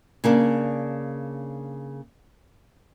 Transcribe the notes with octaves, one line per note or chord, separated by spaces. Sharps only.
C#3 A#3 D4